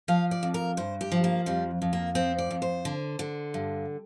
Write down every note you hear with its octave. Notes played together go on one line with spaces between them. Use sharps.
F3 F5
D5
F2
A#4
G2 C5
G4
F3
A#3
F2 G3
F2
A#3
F3 C4
D5
F2
C5
D3
D3
G2